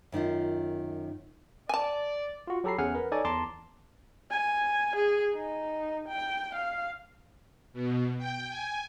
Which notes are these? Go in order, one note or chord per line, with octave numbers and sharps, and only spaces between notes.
F#2 D#3 D#4 F4
D5 G#5 A5
F4 F#4
F#3 G4 A4 A#5 B5 C7
E2 C#4 G#4 F#5 G#5 F6
A#4 B4
D#4 A4 C#5 D5 G#5
E2 A5 A#5 C6 D6
G#5
G#4
D#4
G5
F5
B2
G5
G#5